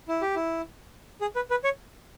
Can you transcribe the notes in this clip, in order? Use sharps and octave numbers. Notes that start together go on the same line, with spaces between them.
E4
G4
E4
G#4
B4
B4
C#5